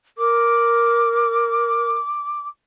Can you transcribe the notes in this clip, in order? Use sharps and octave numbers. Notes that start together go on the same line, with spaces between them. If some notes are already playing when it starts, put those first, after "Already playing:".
A#4 D6